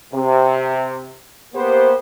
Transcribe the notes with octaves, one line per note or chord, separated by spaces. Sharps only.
C3
A#3 B3 G4 C5